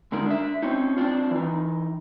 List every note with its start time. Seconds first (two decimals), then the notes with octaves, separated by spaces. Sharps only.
0.12 D3 G#3 D4 D#4 A#4
0.26 D4 E5
0.62 C4 C#4 D#4
0.97 C4 D4 F4
1.31 E3 D#4